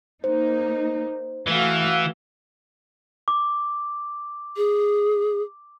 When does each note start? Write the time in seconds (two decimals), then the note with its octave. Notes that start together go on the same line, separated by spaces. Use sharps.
0.24 A#3 D#4 C5
1.48 E3 A3 F#4 F5
3.28 D6
4.57 G#4